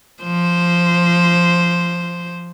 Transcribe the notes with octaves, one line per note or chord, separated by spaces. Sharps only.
F3 C5